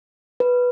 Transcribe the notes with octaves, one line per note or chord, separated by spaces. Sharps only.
B4